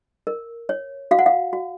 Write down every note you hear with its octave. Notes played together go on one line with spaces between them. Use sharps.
A#4
C#5
F#4 F5
F#5
F5
F#4